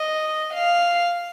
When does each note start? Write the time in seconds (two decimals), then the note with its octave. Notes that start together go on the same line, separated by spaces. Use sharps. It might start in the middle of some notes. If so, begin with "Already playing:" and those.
Already playing: D#5
0.53 F5